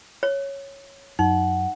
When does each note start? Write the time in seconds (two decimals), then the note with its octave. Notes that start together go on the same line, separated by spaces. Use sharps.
0.23 C#5
1.19 F#2 D#4 F#5